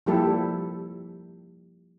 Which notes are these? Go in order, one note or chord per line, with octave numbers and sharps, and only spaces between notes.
F3 G3 A#3 E4 G4 A4